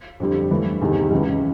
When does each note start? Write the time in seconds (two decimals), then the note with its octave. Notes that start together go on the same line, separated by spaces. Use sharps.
0.20 F2 D3 G3
0.51 G2 E3 A3
0.81 E2 C3 D#3
1.10 C#2 C#3 E3